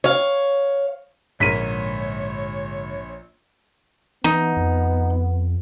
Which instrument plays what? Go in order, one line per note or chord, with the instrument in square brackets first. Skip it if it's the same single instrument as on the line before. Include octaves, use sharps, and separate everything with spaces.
[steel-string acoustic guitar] C#5 F5
[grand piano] A#1 [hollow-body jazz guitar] G#2 D3 A#4 [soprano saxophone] C#5 [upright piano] B6 D#7
[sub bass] E3 [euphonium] B3 [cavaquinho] D#4
[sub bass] F2